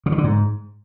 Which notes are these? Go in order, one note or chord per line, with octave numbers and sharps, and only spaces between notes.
C#3
D#3
D3
G#2